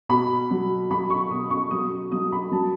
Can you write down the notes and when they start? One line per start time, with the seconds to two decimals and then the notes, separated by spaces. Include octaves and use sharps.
0.09 B2 B5
0.51 F#3
0.90 F#3 B5
1.10 C#6
1.30 B2 D#6
1.50 C#6
1.71 F#3 D#6
2.12 F#3 D#6
2.32 B5
2.51 F#3 A5